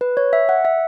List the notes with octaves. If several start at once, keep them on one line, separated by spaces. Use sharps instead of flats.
B4
C#5
E5
F#5
E5